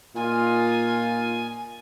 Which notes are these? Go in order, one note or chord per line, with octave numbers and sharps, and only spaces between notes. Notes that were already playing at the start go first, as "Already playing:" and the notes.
A#2 D#4 F4 G#5